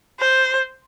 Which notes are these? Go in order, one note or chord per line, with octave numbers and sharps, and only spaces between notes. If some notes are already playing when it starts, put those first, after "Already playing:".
C5